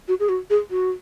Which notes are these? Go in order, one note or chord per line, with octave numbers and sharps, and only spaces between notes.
F#4
G#4
F#4
G#4
F#4